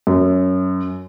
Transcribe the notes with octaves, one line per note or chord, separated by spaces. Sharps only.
F#2